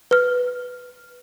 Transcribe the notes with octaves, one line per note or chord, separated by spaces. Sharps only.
B4 F6